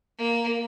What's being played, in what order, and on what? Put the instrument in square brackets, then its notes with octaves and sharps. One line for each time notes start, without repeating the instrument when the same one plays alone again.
[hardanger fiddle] A#3